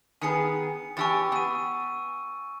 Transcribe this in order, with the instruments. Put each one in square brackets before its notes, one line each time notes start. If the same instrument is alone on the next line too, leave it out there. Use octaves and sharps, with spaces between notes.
[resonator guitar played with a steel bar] D#3 B3 G#4 [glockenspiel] G#5 C#7
[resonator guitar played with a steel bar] E2 G4 G#5 [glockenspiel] C#6 E6 A6
[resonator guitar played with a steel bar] B3 [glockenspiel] E6 D#7